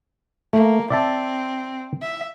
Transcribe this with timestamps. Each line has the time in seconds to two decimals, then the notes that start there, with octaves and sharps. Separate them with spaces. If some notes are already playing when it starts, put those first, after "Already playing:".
0.53 A3 A#3
0.90 C4 D5 E5 A5
2.02 E5